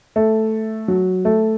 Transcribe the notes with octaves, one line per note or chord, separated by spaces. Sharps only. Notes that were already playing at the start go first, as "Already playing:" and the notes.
A3
F#3
A3